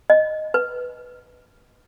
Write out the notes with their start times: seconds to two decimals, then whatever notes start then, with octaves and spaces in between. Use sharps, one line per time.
0.10 D#5
0.54 B4